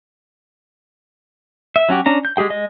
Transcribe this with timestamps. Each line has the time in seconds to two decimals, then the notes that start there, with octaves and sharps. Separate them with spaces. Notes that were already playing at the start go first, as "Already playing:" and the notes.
1.76 E5
1.89 F#3 C#4 F#4 G4
2.06 C#4 D4 A#5
2.25 G6
2.37 G#3 G4 G#4 G5
2.50 G#3 D#5